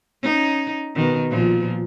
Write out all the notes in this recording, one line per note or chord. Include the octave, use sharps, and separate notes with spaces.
C#4 D#4
B2 D#3
A#2 F3